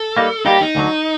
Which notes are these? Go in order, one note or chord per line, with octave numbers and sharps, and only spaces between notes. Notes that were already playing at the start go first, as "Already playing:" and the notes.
Already playing: A4
G3 A#3 D#4
G3 A#3 D#4 G4
D#4
D2 D3 F#3